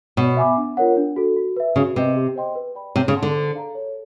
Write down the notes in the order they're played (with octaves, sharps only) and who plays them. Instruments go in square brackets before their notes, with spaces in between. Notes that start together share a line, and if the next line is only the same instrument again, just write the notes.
[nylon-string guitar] B2 [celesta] C#5
[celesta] E5 G#5 B5 D6
D4
F4 A#4 C#5 F#5
D4
F#4 A4
F#4
B4 E5
[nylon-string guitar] C#3 [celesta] F#4
[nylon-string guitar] C3 [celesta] B4 D#5
[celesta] G4
C5 D#5 G5 C6
B4
D5 G5 B5
[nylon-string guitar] C3 [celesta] C#5
[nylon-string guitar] C#3
[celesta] F#5 A5 C6
[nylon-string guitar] D3
[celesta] C5
F5 A#5
C#5